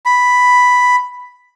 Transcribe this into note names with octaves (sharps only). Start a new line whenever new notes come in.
B5